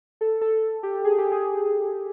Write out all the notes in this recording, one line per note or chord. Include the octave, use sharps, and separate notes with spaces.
A4
A4
G4
G#4
G4
G#4